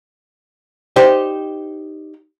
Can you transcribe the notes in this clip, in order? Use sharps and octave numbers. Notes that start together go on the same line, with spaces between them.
D#4 G4 C5 D5